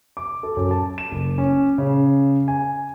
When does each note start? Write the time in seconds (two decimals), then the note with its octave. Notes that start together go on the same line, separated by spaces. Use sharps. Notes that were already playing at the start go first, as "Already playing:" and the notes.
0.17 D6
0.43 A4
0.57 F#2
0.71 A5
0.98 E7
1.11 F#1
1.38 C#4
1.78 C#3
2.48 G#5